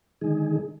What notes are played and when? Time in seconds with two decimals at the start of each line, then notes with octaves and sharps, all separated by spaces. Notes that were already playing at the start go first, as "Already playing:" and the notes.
0.21 D3 D#3 G#3 D#4 G#4